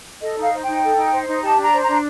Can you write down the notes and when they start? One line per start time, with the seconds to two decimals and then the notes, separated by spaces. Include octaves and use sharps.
0.22 A4 D#5
0.37 D#4 F5
0.52 C5
0.62 D#4 G5
0.83 A4
0.97 D#4
1.13 C5
1.28 D#4
1.42 G4 A5
1.57 D4
1.63 A#5
1.73 C5
1.83 A#5
1.88 D4